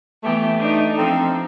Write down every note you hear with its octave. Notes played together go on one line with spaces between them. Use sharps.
E3 A3 B3 G4
D4 D#4
F3 C4 D#4 A4